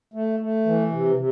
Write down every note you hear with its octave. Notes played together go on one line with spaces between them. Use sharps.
A3
A3
E3
C3
C3